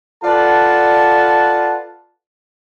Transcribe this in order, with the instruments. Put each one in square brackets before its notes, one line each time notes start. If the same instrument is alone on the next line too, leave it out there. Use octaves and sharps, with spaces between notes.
[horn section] F4 A4 B4 D5 F#5 A5